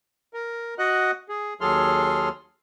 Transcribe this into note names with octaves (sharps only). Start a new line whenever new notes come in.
A#4
F#4 D#5 F#5 F#6
G#4
D#2 F#3 G#4 A4 C6 F6